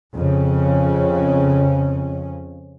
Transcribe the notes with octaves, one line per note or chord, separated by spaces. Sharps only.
F2 C#3 C#4